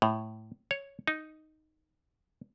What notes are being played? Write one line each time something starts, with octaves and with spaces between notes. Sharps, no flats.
A2
C#5
D#4